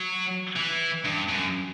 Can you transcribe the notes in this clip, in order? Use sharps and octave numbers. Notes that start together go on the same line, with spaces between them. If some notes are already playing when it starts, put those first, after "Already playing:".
Already playing: F#3
E3
G2
F#2